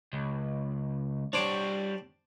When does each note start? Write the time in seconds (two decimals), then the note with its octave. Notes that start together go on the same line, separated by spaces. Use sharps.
0.13 C#2
1.33 G3 D4 C5 C#5 D6